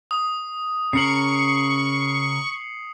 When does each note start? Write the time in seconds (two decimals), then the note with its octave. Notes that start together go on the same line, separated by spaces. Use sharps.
0.11 D#6
0.93 C#3 A#4 C#6 C7 C#7 F#7